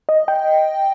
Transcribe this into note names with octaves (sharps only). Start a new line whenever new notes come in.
D#5
G5